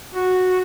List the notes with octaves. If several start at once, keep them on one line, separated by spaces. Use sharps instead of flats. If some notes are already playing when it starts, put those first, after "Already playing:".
F#4